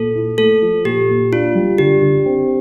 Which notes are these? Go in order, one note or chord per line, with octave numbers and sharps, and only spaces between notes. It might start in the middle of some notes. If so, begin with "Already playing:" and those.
Already playing: A#2 A4
E4
A3 A4
F3
A#2 G4
A#2
D4 F4
G3
D3 G4
D3
C4